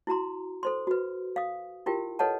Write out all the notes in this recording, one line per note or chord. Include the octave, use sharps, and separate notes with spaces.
E4 F#4 A#5 C6
A4 C5 C6
F#4 B4
F5 D#6
E4 F4 G4 A#4 G5
A4 B4 C#5 D#5 F#5 A5